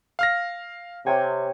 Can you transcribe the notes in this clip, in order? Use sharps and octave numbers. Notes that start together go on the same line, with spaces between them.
F5 F6 A#6
C3 C#5 G5 G#5